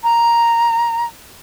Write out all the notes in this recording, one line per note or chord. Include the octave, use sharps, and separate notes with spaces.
A#5